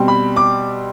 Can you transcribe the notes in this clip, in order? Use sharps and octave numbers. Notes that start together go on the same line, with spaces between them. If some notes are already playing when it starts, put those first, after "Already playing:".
Already playing: B2 G3 C4
B5
D6